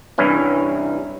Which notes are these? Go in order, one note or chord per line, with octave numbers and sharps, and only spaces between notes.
C2 G2 E3 C#4 E4